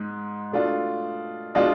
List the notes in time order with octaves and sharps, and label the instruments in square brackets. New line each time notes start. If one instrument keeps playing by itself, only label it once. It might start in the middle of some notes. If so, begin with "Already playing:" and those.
Already playing: [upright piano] G#2 G#3
B2 A3 D4 F4
B2 G#3 D4 F4